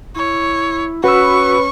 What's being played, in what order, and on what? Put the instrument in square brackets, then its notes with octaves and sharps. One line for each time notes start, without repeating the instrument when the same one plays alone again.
[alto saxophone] E4 [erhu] C#5
[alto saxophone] C#4 [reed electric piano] F#4 E6 [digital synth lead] B4 [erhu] C#6